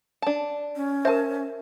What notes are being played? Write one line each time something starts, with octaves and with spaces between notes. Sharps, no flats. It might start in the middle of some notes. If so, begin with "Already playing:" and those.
D4 A5
C#4
A#4 C5 E5 A5